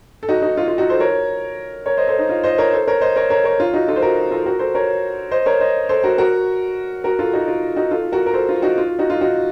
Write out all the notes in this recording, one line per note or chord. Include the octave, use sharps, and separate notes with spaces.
A4
D#4 F#4
D#4 F#4
F4
F4
D#4 F#4
A4 C5
A#4 C#5
A#4 C#5
C5 D#5
A4 C5
D#4
F4
C5 D#5
A#4 C#5
A4 C5
A#4 C#5
C5 D#5
A#4 C#5
A#4 C#5
A#4 C#5
F4
D#4 F#4
F4 A4
C5
F#4 A#4
F4 A4
F#4 A#4
A4 C5
A#4 C#5
C5 D#5
A#4 C#5
C5 D#5
A4 C5
F#4 A#4
F#4 A#4
F#4 A#4
F4 A4
D#4 F#4
F4
D#4 F#4
F4 A4
F#4 A#4
A#4
A4 C5
F4
D#4 F#4
F4
D#4 F#4
F4
D#4 F#4